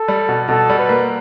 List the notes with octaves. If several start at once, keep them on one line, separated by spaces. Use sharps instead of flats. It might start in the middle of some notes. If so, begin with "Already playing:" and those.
Already playing: A4
G3
B2
B2 A4
G3
B4
A#3